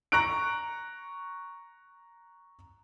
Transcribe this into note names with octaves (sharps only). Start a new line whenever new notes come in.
A#5 C#6 F#6 D7